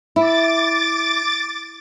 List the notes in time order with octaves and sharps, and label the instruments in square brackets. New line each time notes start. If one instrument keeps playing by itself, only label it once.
[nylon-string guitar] E4 [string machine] D6 A6